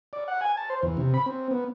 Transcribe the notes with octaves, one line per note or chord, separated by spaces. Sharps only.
D5
F#5
G#5
A5
C5
E2
C3
B5
C4
B3